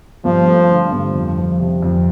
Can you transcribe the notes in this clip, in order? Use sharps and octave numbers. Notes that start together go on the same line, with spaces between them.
G2 F3
A3
D3
G2
F2
F3
C3
F2